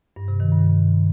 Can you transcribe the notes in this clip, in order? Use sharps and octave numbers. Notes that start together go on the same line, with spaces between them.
G2
C3
D#3
G2